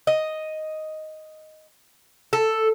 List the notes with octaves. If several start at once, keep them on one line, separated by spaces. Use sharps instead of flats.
D#5
A4